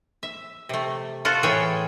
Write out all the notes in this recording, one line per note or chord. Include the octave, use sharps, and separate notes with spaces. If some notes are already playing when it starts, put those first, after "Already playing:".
E5
C3 A3
F4 F#4 A4
A2 E3 G#4 C#5 G5